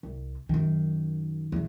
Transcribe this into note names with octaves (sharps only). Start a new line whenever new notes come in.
C2
F#2 D#3
D#1 E2